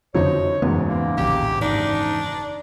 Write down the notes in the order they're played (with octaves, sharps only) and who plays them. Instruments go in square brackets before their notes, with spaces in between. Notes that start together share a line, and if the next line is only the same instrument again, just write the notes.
[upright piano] F#1 D#4 C5 [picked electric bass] F2 D3 F#3 [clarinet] C#5
[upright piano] F#1 E2 G#2 [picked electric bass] B3
[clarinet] A#3
[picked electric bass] D1 A#1 [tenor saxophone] G4
[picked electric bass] G#1 [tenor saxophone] D4 [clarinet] D#4